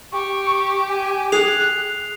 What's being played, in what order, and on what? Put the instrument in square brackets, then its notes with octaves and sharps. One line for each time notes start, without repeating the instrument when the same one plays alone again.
[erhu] G4 [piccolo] C#6
[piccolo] G#5
[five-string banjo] G#4 [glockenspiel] D#6 C7 F7 [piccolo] F#6